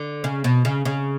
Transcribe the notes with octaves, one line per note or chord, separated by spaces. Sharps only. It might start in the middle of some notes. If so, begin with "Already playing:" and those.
Already playing: D3
C#3
B2
C#3
C#3